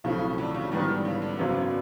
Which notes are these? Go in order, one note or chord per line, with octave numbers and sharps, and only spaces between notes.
B1 A2 C#3 F3 A3 C4
D3
C#3
G#2 D#3 E3 G3 B3 D4
D3
C#3
D3
G#1 F#2 C#3 F#3 B3